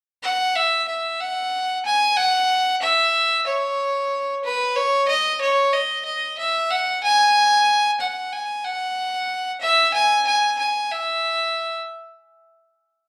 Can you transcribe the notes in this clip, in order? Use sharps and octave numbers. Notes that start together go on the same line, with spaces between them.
F#5
E5
E5
F#5
G#5
F#5
E5
C#5
B4
C#5
D#5
C#5
D#5
D#5
E5
F#5
G#5
F#5
G#5
F#5
E5
G#5
G#5
G#5
E5